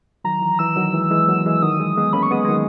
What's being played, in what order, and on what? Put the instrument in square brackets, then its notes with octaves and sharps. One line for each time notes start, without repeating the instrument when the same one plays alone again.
[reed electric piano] D#3 F#3 [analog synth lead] A#5
[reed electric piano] E3
[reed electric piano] E3 [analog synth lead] E6
[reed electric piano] D#3 F#3
E3 G#3
E3 G#3
F#3 A#3
E3 G#3
[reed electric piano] D#3 F#3 [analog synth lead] D#6
[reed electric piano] E3 G#3
G#3 B3
[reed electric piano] A#3 C#4 [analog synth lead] B5
[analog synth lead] C#6
[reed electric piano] G#3 B3 [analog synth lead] D#6
[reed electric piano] G#3
D#3 F#3